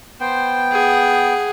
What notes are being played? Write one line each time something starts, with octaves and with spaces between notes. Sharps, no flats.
B3 C5 G5
G#4 F#5